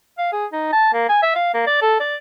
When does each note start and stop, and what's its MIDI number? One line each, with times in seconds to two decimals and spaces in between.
0.18 0.29 77
0.32 0.46 68
0.52 0.71 63
0.73 0.91 81
0.93 1.07 58
1.08 1.21 80
1.23 1.34 76
1.35 1.53 77
1.54 1.66 58
1.67 1.80 74
1.82 1.99 69
2.00 2.16 74